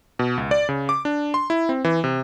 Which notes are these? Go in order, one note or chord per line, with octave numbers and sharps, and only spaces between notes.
B2
C#2
D5
C#3
D6
D4
C6
E4
C4
E3
C3